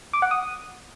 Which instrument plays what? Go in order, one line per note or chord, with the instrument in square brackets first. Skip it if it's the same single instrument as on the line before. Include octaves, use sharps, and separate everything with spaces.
[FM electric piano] D6
F#5
D#6